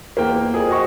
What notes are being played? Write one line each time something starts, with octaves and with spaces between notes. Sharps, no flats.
E2 A#3 G5
F2 G#4
F#4 D#5 C#6